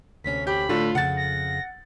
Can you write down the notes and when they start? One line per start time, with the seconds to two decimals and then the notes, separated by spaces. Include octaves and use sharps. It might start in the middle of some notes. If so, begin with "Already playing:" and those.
0.24 D2 C3 C#4 B6
0.47 G4 B5
0.69 A2 D3 F4
0.95 F2 C#3 F#5 A6
1.17 A#6